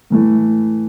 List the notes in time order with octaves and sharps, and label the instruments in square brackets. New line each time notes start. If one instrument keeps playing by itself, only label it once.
[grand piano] A2 E3 A3